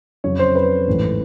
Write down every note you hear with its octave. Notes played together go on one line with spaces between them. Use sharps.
F2 C#3 F#3 C#5
C5
B4
A1 G#2 E3 A3